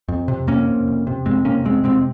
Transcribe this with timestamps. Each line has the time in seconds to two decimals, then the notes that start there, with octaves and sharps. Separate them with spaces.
0.08 F2
0.28 C3
0.47 F2 A#3 C#4
0.67 C3
0.87 F2
1.07 C3
1.26 F2 G#3 C4
1.45 C3 A#3 C#4
1.65 F2 G#3 C4
1.84 C3 G#3 C4